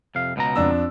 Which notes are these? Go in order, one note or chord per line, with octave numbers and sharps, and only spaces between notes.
F2 C3 F5
C#2 B2 A#5
F2 D4 E6